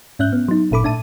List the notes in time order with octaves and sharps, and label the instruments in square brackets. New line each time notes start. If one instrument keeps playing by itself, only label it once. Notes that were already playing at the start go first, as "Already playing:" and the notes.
[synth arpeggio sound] G#2 C#4 E5 F#6 G6
B3
F#3 D#4
G1 A#2 A4 B5 D6
A2 D4 E5 A5 D#7